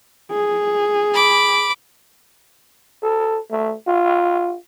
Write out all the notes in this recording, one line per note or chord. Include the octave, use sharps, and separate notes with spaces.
G#4
B5 D6
A4
A3
F4